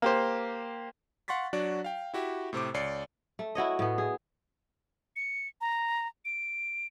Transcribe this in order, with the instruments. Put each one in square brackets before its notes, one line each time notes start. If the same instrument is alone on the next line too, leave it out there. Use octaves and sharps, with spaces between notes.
[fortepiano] A#3 G4 C5
[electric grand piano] F5 F#5 C6 C#6 A6 B6
F#3 D4 F#4 C#5 D5
F5 G5
E4 F#4 G4 E5
A2 C3 C5 D6
C#2 C#5 D5 C7 C#7
[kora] A3
E4 F#4 C#5 D#5
A2 B3
G#4
[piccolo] C#7
A#5
D7